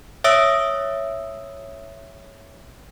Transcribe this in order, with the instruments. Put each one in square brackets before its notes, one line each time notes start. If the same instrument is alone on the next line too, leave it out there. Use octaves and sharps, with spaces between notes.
[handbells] C#5 E5 D#6 E6 A#6 D7